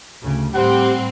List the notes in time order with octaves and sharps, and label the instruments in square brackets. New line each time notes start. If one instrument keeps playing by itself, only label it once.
[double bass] D2 C#3
[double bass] A2 G3 [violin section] C4 [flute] G4 [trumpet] F#5